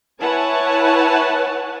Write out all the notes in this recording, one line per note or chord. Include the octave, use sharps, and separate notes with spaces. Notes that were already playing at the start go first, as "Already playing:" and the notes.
E4 B4 C#5 F#5 G#5 A5